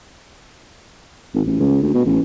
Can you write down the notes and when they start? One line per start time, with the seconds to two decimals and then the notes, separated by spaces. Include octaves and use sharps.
1.34 G#1
1.47 A1
1.60 C#2
1.82 D2
1.94 B2
2.06 A1